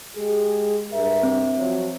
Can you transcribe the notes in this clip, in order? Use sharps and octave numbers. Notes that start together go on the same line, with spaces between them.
G#3 G4 G#4
G2 A#4 E5
C4
F3 F#3